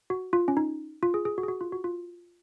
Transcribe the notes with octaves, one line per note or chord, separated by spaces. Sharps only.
F#4
F4
C#4
D#4
F4
G#4
G#4
F#4
G#4
F#4
F4
F#4
F4